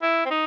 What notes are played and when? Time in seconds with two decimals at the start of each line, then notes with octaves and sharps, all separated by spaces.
0.02 E4
0.25 C4
0.30 D#4